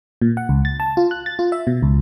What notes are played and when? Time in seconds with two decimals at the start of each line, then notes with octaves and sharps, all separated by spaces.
0.22 A#2
0.37 F#5
0.49 C#2
0.65 A6
0.80 A5
0.97 F4
1.11 F#6
1.26 A6
1.39 F4
1.52 E5
1.67 B2
1.82 C#2